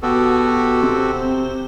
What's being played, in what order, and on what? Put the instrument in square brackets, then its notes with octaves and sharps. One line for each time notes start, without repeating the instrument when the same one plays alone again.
[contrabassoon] B2 [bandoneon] F#4 G4 A4
[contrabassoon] C3 [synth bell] C4